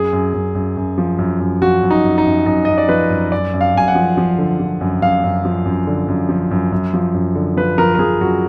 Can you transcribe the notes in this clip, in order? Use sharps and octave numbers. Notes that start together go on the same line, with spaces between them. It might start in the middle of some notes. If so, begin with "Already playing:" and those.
Already playing: F#2 G#4
F#2
F#2
F#2
F#2
F3
F#2
F#2
F3 F#4
F#2
D#4
F#2
D#4
F#2
F#2 D#4
F#2 D#5
D5
F3 B4
F#2
F#2 D5
F#2
F5
F#2 G#5
F#5
F3
F3
D3
F3
F#2
F#2 F5
F#2
F3
F#2
D3
F#2
F3
F#2
F#2
F3
F#2
D3
F3 B4
F3 A#4
A#4
F3 G#4
F#2 F#4